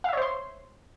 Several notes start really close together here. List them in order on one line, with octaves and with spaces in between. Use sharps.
F5 E5 C#5 C5 C6